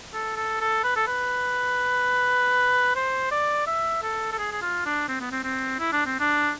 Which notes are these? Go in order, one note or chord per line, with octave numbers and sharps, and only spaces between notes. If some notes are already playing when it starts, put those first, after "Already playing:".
A4
A4
A4
B4
A4
B4
C5
D5
E5
A4
A4
G#4
G#4
F4
D4
C4
B3
C4
C4
E4
D4
C4
D4